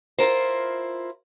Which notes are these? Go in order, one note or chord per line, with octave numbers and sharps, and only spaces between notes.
E4 F4 A#4 C5